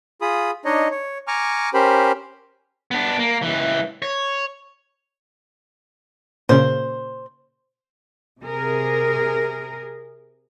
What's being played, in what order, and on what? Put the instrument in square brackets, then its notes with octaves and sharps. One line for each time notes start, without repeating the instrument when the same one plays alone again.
[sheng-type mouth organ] F4 G#4 B5 D#6
D4 D#4 C#5 D#5
C#5
G#5 A#5 C#6 D6 F6
C#4 G4 A#4 C5 B5
[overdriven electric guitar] B3 D4
A#3
C#2 E3
C#5
[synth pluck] A#2 C#3 [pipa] C5
[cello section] C3 G#4 A#4